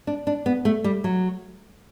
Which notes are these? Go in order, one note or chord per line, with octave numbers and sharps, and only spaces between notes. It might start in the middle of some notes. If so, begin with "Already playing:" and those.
D4
D4
B3
A3
G3
F#3